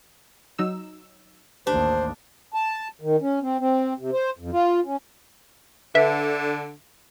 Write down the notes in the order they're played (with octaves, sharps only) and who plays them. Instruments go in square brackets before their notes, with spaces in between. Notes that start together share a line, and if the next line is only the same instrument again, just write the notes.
[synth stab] F#3 D#4 E6
[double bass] A1 D#2 [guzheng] D4 [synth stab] G4 [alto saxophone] C5
[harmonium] A5
D#3
C#4
C4
C4
C3
C5
F2
F4
C#4
[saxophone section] D3 [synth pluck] B4 E5